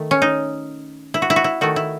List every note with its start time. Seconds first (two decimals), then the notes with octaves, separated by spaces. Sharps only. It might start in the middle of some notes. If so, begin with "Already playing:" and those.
Already playing: D#3 A3
0.11 C#4
0.22 D#4
1.14 E4
1.22 F#4
1.30 E4
1.36 F#4
1.44 E4
1.61 D#3 A3 F#4
1.76 E4